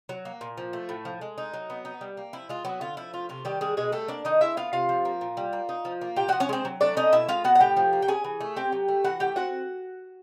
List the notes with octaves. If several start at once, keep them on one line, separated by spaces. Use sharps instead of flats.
F#3
A#3
A#2
F3
A3
A2
F3
G#3
D#4
F#3
B3
D#4
G3
A#3
F3 E4
G#3 F4
F#3 B3 F#4
D3 F4
F3 E4
A3 F4
C3 F4
D#3 G3 G4
G3 G#3 G#4
B2 G#3 G#4
G3 A3 A4
A#3 D4 D5
D#3 D#4 D#5
G#3 E4 E5
B3 F4 F5
C3 F4 F5
F3
A#3
A#2
G3
A#3
D#4
F3
A#3
A#2 G4 G5
F3 F#4 F#5
C#4 C#5
G#3 C4 C5
F#3
A3 D4 D5
C#4 D#4 D#5
B2 E4 E5
G#3 F4 F5
B3 F#4 F#5
F#5
A2 G4 G5
F3
A#3
G5
C#4 G#4 G#5
E3
A3
C4 G4 G5
F#3
A3
E3 F#4 F#5
A3 G4 G5
C4 F#4 F#5